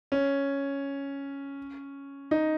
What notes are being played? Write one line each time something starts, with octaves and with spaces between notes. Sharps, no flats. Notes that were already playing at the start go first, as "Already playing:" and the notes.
C#4
D#4